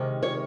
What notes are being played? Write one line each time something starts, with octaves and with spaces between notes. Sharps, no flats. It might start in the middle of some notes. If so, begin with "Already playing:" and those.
Already playing: C3 D#3 G#3 C#4
C#5